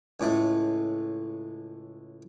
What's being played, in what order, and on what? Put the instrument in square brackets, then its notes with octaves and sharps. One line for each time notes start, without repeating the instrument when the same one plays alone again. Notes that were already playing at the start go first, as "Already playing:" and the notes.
[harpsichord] C#2 A2 A3